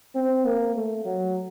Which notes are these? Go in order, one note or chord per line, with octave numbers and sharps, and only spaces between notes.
C4
A#3
A3
F#3